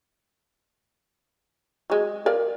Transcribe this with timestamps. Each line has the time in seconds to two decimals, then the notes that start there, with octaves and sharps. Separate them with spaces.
1.90 F#3 G#3
2.26 A#4 D5 F5